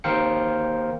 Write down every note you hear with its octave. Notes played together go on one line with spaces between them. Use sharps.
D#2 A#4 C5 F5 G5 C#7